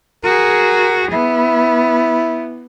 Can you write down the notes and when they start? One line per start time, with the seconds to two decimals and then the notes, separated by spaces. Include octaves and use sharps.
0.24 F#4 G#4 A#4
1.12 B3 E4